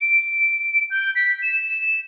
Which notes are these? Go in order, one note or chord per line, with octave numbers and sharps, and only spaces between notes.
D7
G6
B6
E7